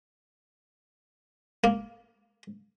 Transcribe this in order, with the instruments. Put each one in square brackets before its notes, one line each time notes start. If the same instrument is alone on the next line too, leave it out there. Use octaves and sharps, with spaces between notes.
[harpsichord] A#3